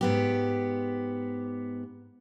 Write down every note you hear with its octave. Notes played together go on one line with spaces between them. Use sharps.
G#2 B3 G4